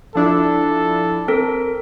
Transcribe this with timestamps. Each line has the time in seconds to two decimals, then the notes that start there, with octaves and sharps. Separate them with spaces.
0.15 F3 D4 E4 A4
1.28 C4 A4 A#4